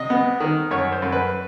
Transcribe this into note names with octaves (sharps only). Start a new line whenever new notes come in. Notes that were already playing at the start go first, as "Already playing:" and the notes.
Already playing: C3 D#5
B3
D#3
F#2 C#5
C5
F#2
B4